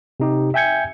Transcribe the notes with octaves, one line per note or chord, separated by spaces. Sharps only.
C3 D#4 G4
E5 G5 G#5 G6 G#6 C#7